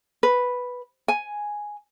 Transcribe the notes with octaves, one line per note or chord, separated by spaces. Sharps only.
B4
G#5